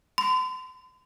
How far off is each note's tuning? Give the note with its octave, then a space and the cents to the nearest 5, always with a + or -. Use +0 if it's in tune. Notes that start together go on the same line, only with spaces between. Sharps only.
C6 -40